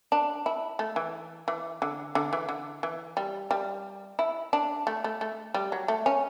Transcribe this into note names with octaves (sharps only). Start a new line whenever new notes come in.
D4
E4
A3
E3
E3
D3
D3
E3
D3
E3
G3
G3
E4
D4
A3
A3
A3
G3
F#3
A3
C#4